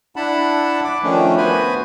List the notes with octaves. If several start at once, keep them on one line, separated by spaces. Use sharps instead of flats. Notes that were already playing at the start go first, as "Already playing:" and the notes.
D4 E4 F#5 A5 B5
D6
D#3 F3 A3 C#4 D4
B3 F#4 B4 C5 G#5 B5